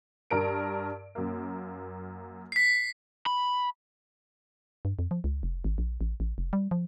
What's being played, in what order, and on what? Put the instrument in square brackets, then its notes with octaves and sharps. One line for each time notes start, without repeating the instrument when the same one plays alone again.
[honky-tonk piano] G2 A#4 D7
F#2 A#3
[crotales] B6 C7
[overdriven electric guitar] B5
[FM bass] G2
F2
F3
C#2
F1
G#1
A#1
A1
A1
F1
G3
F3